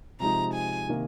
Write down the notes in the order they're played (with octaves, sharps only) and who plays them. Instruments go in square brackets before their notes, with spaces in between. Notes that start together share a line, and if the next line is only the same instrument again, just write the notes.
[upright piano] C3 F3 G#3 D#4 [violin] A#5
[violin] G#5
[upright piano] C3 D#3 A#3